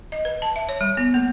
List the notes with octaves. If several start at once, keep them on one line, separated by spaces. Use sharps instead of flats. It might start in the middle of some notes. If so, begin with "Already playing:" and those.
D#5
B4
A5
E5
C#5
G3
B3
A#3